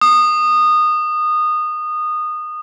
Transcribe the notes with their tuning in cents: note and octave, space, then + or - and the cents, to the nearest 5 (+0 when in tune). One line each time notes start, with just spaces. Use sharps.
D#6 -20